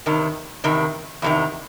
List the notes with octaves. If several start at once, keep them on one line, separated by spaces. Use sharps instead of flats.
E2 C3 D#3
E2 C3 D#3
E2 C3 D#3